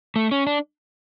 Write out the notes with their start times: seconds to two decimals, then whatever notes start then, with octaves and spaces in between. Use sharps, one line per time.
0.16 A3
0.32 C#4
0.47 D4